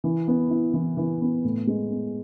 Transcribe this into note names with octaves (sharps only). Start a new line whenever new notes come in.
E3
B3
E4
E3
E3
B3
A2
G#3
B3